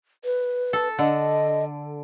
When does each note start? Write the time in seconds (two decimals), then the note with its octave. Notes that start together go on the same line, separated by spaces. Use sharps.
0.25 B4
0.73 A4
0.99 D3 D#5